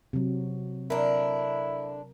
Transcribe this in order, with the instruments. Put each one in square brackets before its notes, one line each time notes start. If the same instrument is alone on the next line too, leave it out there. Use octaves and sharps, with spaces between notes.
[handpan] C3 F#3
[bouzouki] D3 D4 [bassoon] E4 [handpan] A#4